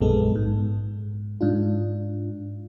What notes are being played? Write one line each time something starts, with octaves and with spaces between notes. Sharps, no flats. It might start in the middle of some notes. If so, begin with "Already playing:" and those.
A#1 F#2 G#3 B3 A4
G#2
G#2 D4 F4